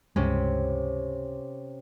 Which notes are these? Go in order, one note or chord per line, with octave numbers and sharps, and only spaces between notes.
C#2 G2 C3 G#3 C#4